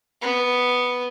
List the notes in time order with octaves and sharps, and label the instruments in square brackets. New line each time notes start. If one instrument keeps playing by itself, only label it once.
[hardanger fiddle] B3